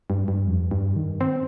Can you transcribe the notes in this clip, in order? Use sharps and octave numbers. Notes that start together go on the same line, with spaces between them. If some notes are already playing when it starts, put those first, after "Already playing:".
G2
G2
F2
G2
D#3
C4